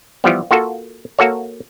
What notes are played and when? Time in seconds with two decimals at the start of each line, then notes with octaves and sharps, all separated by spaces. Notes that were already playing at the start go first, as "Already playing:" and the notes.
0.24 E3 F3 G3 B3
0.51 A#3 F4 F#4 A4
1.19 A#3 F#4 A4 C#5